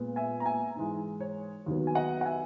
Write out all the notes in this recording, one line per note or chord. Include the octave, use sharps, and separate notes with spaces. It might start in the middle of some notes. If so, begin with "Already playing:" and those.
Already playing: A#2 G#3 B3
E5 G#5
A#5
E5 G#5
G#2 E3 G#3
C#5
D#2 D#3 F#3 B3
G#5
D#5 F#5
F#5
E5 G#5